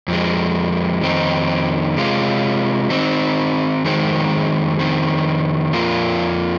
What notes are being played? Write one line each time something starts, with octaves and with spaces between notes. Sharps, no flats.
F2 F3 G#3
F2 D#3 C4 D#4
C3 G#3 F4
D#3 C4 D#4
F2 D#3 G#3 C4
F2 D#3 C4
F2 F3 A#3 F4